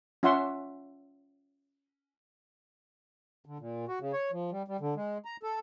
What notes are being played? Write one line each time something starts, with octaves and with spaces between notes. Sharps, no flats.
C#4 F4 E5 F#5 C6
D3
A#2
F#4
C#3
C#5
F3
G3
G3
D3
G#3
A#5
A4